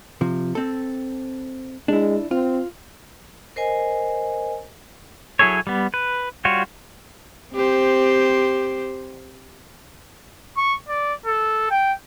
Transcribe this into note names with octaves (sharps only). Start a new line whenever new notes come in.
C3 F3
C4 A4
G#3 D4 E4
C4 F4
A#4 C5 D#5 G#5
F#3 E4 G#4 A4 C#5
G3 B3
B4
G3 F4 F#4 C#5
C4 G4 C5
C#6
D5
A4
G5